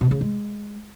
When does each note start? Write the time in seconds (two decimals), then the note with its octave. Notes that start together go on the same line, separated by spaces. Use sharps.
0.01 B2
0.11 C#3
0.21 G#3